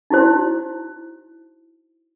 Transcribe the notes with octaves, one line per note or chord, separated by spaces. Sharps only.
D#4 E4 F#4 C5